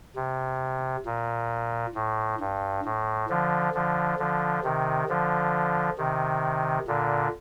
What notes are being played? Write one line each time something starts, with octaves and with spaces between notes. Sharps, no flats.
C3
A#2
A2
G2
A2
D3 F3
D3 F3
D3 F3
C3 D#3
D3 F3
C3 D#3
A#2 D3